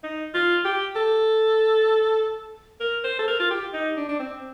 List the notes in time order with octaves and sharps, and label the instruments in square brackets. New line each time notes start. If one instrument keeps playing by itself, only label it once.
[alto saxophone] D#4
F4
G4
A4
A#4
C5
A4
A#4
F4
G4
D#4
D4
D4
C4